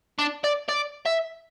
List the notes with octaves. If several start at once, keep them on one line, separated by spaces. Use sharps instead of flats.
D4
D5
D5
E5